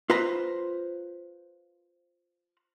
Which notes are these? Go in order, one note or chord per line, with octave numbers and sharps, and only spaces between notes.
F4 B4 C5 A#5